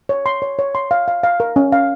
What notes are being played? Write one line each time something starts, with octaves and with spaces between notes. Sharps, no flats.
C#5
C6
C#5
C#5
C6
F5
F5
F5
A#4
C#4
F5